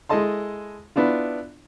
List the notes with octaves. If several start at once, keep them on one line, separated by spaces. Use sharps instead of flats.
G#3 E4 A4 D#5 A5 C6
B3 D4 E4 F4